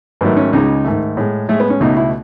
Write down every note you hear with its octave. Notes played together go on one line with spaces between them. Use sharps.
G#2 D#3 F#3 A3 B3
C#4
C#2 C#3 G#3 D#4
G#2 D#3 A3
A2 G#3
A2 G#3 A3
B3
C#4
C#2 B2 A3 D#4
E4